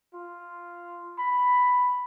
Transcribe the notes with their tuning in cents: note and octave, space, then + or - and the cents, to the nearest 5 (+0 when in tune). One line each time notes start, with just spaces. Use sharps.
F4 -5
B5 +5